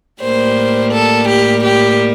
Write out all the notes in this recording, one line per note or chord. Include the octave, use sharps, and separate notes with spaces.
A2 G3 A#3 C5
A4
G4
G4